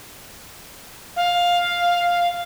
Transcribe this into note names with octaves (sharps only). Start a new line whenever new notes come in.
F5